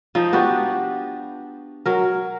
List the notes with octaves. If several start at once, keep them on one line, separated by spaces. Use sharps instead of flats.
F3 D#4
B3 D4 F#4 G4
F#3 A#4